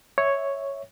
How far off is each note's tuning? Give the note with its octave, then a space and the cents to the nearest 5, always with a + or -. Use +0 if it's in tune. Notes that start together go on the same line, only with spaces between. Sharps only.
C#5 +0 E5 -10